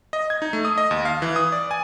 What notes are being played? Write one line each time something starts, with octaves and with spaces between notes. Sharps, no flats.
D#5
G#6
D#4
A3
D#6
D#5
D#2
F5
E3
D#6
D5
G#5